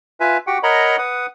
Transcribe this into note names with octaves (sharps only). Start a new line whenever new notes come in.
F4 B4 E5 G#5
F#4 G4 F#5 G5
A#4 C#5 D#5 F#5 A#5 B5
B4 F#5 D#6